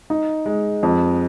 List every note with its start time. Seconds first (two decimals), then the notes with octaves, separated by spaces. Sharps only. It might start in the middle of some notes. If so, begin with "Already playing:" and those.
0.10 D#4
0.46 G#3
0.83 F2